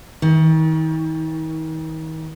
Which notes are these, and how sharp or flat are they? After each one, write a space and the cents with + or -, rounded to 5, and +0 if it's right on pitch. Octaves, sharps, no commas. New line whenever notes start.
D#3 +40